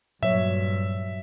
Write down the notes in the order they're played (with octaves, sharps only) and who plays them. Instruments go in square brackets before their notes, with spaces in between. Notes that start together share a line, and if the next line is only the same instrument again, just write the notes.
[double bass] G2 [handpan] A#2 F#3 C#5 [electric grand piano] E5